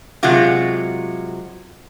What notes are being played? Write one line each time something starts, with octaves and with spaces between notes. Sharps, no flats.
C3 F#3 G#3 F4 F#4